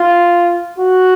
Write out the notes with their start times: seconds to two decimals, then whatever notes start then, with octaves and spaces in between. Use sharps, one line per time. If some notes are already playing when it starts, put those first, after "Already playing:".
Already playing: F4
0.79 F#4